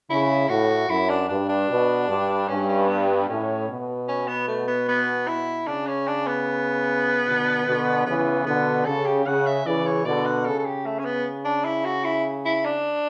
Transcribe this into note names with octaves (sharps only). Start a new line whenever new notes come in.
C#3 E4
A2 F#4
F#2 E4
D4
G2 D4
D4
B2
G2
G2 C#4
C#4
B3
B3
A2 C#4
B2
C#4
B3
A3
B3
B3
E4
C#3 D4
C#4
D4
B3
B2 D3
B2 D3
C#3 E3 B3
B2 D3 B3
C#3 A4
G4
C#3 F#5
E5
C#3 E3 D5
C#5
B2 D3 D5
F#5
C#3 A4
A4
G4
A3
C#4
B3
D4
E4
F#4
E4
E4
D4